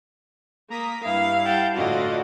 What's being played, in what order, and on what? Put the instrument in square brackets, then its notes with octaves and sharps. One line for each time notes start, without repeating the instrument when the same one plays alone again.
[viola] A#3 [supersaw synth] A#5 D#6 B6
[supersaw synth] G2 E4 [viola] F5
[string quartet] F#5 G5 A5
[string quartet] A2 D3 D#5 [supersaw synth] F4 F#4 [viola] D5